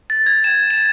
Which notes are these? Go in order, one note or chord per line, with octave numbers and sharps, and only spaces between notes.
A6
G#6
E7
E7